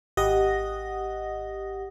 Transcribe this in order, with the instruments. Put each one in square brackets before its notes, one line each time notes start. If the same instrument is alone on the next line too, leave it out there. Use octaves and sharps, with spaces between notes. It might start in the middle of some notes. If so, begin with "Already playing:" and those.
[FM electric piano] G#1 G4 D#5 F#5 D#6 A#6